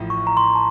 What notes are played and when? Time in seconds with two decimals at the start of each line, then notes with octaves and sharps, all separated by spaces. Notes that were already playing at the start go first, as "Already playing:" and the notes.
Already playing: A1 A2 F3
0.10 C#6
0.27 A#5
0.37 C6
0.55 A5